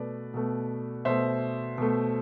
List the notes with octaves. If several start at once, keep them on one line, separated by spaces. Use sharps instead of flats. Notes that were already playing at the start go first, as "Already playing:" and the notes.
Already playing: B2 A3 B4 D5
B2 A3
B2 A3 C5 E5
B2 A3